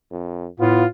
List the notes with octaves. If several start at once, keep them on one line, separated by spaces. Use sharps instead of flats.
F2
A2 B3 F4